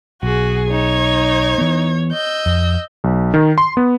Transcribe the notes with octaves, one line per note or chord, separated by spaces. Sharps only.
B1 F#4 G#4
D#4 C#5 G#6
E3 B3
D#5 E6 G6
F2
B1
D#3
C6
B3